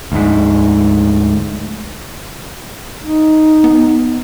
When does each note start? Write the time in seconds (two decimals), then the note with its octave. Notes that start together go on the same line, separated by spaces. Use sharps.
0.12 D2 G#2
3.03 D#4
3.64 B3